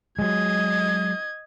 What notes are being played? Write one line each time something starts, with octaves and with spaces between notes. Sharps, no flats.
F#3 G#3 D#5 G#6